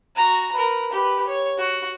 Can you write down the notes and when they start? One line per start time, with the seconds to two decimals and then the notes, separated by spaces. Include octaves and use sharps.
0.16 F#4 A#5
0.53 A#4 B4
0.92 G4 B4
1.27 C#5
1.58 F#4